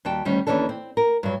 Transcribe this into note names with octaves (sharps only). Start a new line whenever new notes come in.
D#2 G3 F#4 G5 A5
D2 D#3 G3 C#4
D#2 G#2 E3 C#4 D4 A4
C4
A#4
G2 F#3